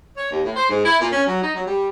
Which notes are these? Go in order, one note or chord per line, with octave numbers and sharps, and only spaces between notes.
C#5
D#2
A2
C5
G#2
E4
A#2
C#4
F#3
D#4
F#3
G3